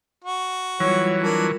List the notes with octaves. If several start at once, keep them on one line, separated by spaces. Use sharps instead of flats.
F#4
E3 F#3 G3 F4 C#5
D4 A#4